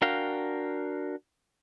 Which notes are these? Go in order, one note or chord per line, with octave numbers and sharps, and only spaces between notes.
D4 F#4 A#4 F5 G5